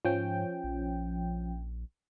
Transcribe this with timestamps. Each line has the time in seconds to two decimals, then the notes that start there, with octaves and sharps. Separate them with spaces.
0.05 G#2 F3 C#4 G5
0.64 A#1